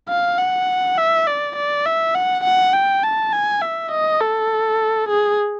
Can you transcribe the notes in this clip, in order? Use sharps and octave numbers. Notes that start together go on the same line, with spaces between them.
F5
F#5
E5
D5
D5
E5
F#5
F#5
G5
A5
G#5
E5
D#5
A4
G#4